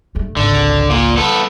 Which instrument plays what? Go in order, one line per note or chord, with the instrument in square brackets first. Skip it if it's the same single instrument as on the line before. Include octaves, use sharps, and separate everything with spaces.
[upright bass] G2 A3
[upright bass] G#1 C#2 [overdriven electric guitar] D3
[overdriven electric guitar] A#2
B3 A4